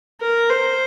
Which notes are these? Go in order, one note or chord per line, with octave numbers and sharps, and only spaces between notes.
A#4
C5